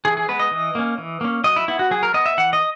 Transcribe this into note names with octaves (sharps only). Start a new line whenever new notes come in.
E3 G#4
G#4
G#3 B3 B4
D#5
E3
A#3 C#4
E3
A#3 C#4
F#3 D#5
E4
B3 E4
F#4
F#3 G#4
A#4
B3 D#5
E5
E3 F#5
D#5